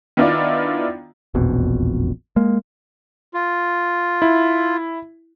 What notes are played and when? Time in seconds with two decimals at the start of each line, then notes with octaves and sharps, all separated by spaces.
0.17 D#3 B3 D4 E4 F4 D5
1.34 E1 A#1 F2 B2
2.36 G#3 A#3
3.34 F4
4.22 E4